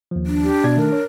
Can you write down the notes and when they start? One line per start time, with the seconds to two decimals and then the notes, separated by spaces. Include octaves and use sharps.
0.11 D#2 F3
0.26 D4
0.43 G4
0.64 B2 D5 G#6
0.77 D#3 A3 A#4
0.92 C#5